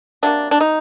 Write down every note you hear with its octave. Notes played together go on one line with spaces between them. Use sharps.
C3 F#3 A#3 D4
D4
D#4